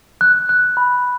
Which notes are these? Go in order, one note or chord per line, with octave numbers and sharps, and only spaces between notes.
F#6
F#6
B5